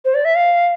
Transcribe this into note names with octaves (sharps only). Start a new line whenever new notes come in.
C5
D5
E5
F5